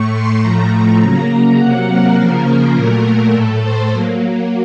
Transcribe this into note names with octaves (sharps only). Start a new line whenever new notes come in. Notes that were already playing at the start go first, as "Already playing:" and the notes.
Already playing: A2 A3 C#6
C6
A2 F3 A3 A#5
C#3 F#3 A#3
C3 F#3 A#3 F#5
A#4
C#3 F3 A#3
A#2 F#3 A3 A#4
A2 A3 A4
C5
F#3 A#3